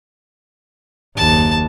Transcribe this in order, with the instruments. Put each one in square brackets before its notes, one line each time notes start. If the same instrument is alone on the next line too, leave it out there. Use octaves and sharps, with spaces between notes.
[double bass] F#1 D#2 [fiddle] A5